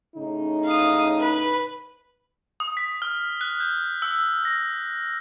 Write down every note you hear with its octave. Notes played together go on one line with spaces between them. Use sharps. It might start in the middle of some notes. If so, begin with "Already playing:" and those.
A2 C#3 D#4
F5 D#6
B4
D#6
B6
F6
F#6
G6
E6
A#6